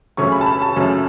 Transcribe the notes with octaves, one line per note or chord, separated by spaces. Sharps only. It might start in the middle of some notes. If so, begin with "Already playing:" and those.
F#2 C#3 A3 C#4 C#6
B5
A5
B5
A5
F#2 C#3 A3 C#4